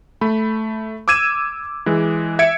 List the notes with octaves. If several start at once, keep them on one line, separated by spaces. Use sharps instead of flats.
A3 B5
D6 E6 G#6 D#7 E7
E3 G#3
E5 G#6 C#7 D7